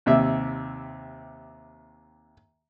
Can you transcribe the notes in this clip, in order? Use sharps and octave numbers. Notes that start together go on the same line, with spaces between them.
D#2 C3 E5